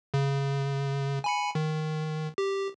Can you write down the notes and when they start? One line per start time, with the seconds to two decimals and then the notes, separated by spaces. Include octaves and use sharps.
0.14 C#3
1.24 G#5 B5 C#7
1.55 D#3
2.38 G4